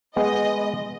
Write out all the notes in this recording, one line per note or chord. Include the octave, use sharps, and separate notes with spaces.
G#3 B3 D#5